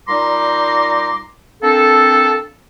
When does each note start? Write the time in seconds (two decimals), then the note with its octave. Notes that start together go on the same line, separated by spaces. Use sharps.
0.08 A#2 G3 D#4 A#5 C6 D6
1.63 A#3 C4 D4 A4